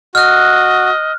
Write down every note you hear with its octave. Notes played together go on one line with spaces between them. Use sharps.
F#4 D#5 F6 F#6